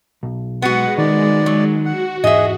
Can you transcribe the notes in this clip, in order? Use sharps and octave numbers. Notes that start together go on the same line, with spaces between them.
B1
G#3 B3 F#4 F#5
D#3 D#4 D5
F#3
F#4 F#5
E2 G#2 G#4 D#5 E5